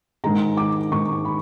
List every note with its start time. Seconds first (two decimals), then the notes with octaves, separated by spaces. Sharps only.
0.24 G#2 D#3 G#3 A#5
0.57 D6
0.91 G#2 D#3 G#3 C#6
1.25 B5